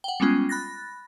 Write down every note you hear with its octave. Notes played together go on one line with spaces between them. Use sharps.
F#5 G5
G3 G#3 B3 C#4 F4
B5 F#6 A6 A#6